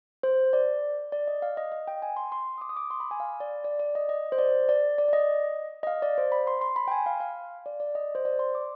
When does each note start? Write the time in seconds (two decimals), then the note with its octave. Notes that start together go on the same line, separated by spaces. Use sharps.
0.23 C5
0.53 D5
1.12 D5
1.28 D#5
1.42 F5
1.57 D#5
1.72 D#5
1.88 G5
2.02 G#5
2.16 C6
2.32 C6
2.58 D#6
2.61 D6
2.69 D#6
2.76 D6
2.91 C6
3.00 B5
3.11 G#5
3.20 F5
3.40 D5
3.64 D5
3.79 D5
3.95 D#5
4.09 D#5
4.32 C5
4.38 D5
4.69 D5
4.98 D5
5.08 D5
5.13 D#5
5.83 D#5
5.87 F5
6.02 D5
6.18 C5
6.32 B5
6.47 C6
6.61 C6
6.76 B5
6.88 G5
6.91 G#5
7.06 F5
7.20 F5
7.66 D5
7.80 D5
7.95 D#5
8.15 C5
8.25 D5
8.39 C6
8.55 D6